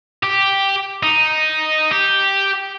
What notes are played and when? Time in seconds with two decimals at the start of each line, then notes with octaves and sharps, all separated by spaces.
0.23 G4
1.03 D#4
1.91 G4